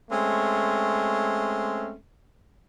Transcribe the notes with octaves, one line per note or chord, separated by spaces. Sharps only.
G#3 A3 C4 C#4